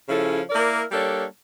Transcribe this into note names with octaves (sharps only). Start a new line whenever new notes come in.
C#3 F3 C#4 E4 A4
A#3 E4 A#4 D5
G3 A#3 D4 A4 C#5